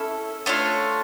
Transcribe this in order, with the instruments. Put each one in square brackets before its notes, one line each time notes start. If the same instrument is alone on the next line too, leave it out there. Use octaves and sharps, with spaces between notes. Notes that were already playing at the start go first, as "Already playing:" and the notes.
Already playing: [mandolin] C#4 E4 A4
A3 D4 F4 C#5 C#6